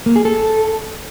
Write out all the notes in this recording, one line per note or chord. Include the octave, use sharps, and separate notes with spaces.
A#3
G#4
A4